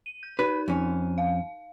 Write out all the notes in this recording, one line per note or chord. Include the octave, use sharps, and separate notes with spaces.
D#7
G6
D#4 A#4 B4
F2 C#4
F5